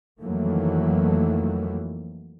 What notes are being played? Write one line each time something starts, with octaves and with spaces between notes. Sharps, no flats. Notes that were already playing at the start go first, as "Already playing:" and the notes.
F2 D#3 E3 F#3 A3 A#3